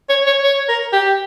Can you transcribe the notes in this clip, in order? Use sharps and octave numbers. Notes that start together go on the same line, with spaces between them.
C#5
C#5
C#5
A#4
G4